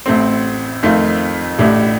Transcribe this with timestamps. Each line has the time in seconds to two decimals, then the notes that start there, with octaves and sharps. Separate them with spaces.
0.06 A1 A2 A3 C4
0.83 F2 D#3 A3 C4 F4
1.59 A1 A2 A3 D4 G4